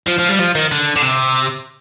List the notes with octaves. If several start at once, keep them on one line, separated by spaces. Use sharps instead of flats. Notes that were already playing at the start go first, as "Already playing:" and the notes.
F3
F3
G3
F3
D#3
D3
D3
C3